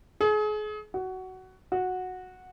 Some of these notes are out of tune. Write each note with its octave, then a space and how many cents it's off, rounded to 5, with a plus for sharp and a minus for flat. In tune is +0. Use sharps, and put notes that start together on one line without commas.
G#4 +35
F#4 +15
F#4 -10